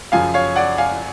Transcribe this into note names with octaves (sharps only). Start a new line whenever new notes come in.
F#2 C#3 F3 F5 G#5
C#5 F5
D5 F#5
F5 G#5